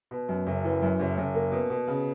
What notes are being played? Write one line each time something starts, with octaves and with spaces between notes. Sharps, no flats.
B2
F#2
F#1
E3
F#2
F#1
F#1
A#3
B2
B2
C#3